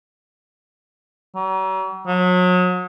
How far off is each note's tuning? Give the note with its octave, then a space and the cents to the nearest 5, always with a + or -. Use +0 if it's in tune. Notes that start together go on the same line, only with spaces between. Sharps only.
F#3 +45
F#3 -35